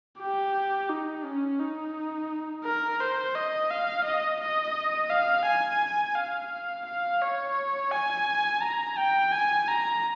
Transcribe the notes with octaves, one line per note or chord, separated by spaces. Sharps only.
G4
D#4
C#4
D#4
A#4
C5
D#5
F5
D#5
D#5
F5
G#5
F5
F5
C#5
G#5
A#5
G5
G#5
A#5